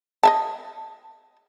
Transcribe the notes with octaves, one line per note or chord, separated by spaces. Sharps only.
D#5 E5 A5